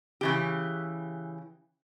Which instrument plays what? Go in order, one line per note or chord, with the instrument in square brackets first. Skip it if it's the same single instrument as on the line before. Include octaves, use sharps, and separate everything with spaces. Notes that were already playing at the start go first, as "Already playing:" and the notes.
[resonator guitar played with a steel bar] C#3 E3 G4